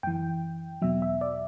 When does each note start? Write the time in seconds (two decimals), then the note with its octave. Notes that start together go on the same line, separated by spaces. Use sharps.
0.03 F#2 E3 G5
0.82 E2 B2 F#3 E5
1.02 E5
1.21 D5